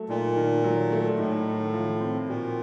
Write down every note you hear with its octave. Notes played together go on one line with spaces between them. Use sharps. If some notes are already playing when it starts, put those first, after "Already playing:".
Already playing: F#3 A3
A#2 D#4
D#3
F#3
A3
A2 D#4
D#3
F3
C4
A#2 F#4